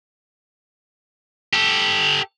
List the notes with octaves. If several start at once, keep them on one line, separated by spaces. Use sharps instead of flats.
G4 A4